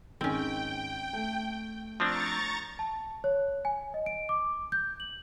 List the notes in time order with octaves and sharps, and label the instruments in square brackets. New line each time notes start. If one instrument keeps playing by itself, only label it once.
[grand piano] G#2 D#3 G#3 [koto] C4 C#4 [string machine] G5
[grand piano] A3
[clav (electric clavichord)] F3 C4 D4 [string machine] A#5 C#6 A6
[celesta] A5
C#5
G#5
D#5
D7
D6
G6
F#7